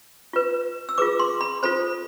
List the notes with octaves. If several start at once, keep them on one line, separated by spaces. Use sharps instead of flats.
F4 B4
E6
F4 G#4 B4 D6
C6
B5
F4 A4 C5 B5